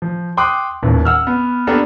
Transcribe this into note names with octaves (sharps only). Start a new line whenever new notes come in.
F3
G5 C6 D6 D#6 F#6
D#1 A1 D#2
F#5 E6 F6
B3
A#3 B3 D4 G4 A4 A#4